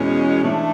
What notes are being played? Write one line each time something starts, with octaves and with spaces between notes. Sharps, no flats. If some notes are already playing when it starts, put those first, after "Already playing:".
Already playing: E2 B2 G#3 C#4
G#2 E3 A3 D4